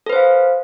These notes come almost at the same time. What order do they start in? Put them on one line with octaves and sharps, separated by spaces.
A4 B4 C5 F5